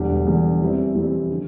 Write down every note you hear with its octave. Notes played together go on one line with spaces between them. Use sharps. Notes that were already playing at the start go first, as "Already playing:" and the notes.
Already playing: E1 E2 D3 G3
E1 E2 D3 G3
F2 E3 G3 C4 E4
F2 E3 G3 C4 E4
D3